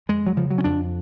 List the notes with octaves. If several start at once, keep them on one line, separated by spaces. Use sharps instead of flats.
F2 G#3
F#3
C#3 F3
F#3
C#4
F2 D4